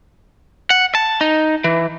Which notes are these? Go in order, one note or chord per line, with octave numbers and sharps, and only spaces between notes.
F#5
A5
D#4
E3